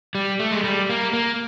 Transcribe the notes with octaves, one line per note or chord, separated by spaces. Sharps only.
G3
A3
G#3
G3
A#3
A#3